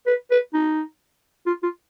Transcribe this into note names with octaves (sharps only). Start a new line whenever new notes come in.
B4
B4
D#4
F4
F4